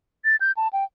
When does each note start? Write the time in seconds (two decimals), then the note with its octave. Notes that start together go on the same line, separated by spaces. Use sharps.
0.25 A6
0.41 G6
0.57 A5
0.73 G5